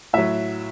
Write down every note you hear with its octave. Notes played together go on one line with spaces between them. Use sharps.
A2 F#3 E5